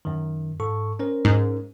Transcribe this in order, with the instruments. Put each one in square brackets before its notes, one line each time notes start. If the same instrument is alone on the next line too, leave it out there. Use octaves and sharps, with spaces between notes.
[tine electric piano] F#2 D#3
G#2 A4 C#6
C#4 A#4 C5
[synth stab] G#2